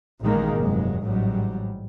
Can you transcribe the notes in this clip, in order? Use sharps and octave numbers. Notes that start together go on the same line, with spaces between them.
A1 A#2 D#3 G#3 A#3
F1 G2 F#3 G#3
A1 G#2 F#3 G3